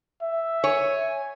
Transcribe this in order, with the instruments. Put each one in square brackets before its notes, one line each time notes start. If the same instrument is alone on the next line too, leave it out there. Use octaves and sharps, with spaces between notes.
[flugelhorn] E5
[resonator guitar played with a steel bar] C#5 [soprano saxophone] G#5